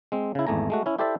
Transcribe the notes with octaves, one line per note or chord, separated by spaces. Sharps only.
G#3 C4
C#3 E4
G#1 E2 A3 G#5 A#5
G#3 A3 F#4
C#4 E4
E4 G4 A4 C5 D5 E5